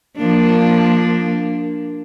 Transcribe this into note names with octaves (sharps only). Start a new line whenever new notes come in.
F3 A#3 D4